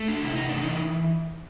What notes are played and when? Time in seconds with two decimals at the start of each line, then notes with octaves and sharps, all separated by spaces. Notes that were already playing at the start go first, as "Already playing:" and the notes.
Already playing: A3
0.08 D4
0.23 C3 E4
0.35 D#4
0.49 E3 D4
0.61 D#4